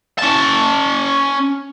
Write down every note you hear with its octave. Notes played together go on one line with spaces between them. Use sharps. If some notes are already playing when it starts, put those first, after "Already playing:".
C#4 A5